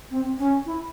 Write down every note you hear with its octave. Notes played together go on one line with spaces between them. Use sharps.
C4
C#4
E4